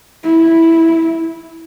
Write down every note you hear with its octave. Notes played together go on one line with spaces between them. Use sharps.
E4